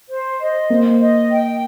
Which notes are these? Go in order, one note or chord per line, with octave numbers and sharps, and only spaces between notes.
C5
D#5
A#3 C5
D#5
G5